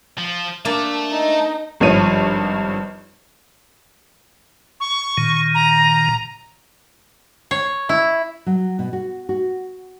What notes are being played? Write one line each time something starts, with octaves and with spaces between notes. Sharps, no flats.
F3
A#3 D4 E5 A5
D#4
G#1 G2 F3 C#5 D#7
C#6
A#2 D#3
A#5
C#5
E4
F#3
B2
F#4
F#4